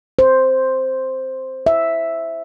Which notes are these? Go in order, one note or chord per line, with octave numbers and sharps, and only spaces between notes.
C5
E5